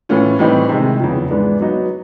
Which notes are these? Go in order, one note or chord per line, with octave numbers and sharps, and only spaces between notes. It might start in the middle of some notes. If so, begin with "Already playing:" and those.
A2 E3 A3 C#4 F4
A2 E3 G3 C4 D#4
C3 D#3 G#3
E2 C#3 F3
G#2 E3 G#3 B3 D4
F#3 B3 D#4